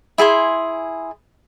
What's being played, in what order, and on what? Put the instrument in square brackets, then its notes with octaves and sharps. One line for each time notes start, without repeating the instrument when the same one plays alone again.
[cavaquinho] E4 G#4 G#5 C6